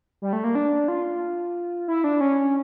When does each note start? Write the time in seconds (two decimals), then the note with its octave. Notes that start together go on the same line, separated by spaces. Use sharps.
0.22 G3
0.33 A3
0.44 A#3
0.55 D4
0.88 F4
1.88 E4
2.04 D4
2.21 C#4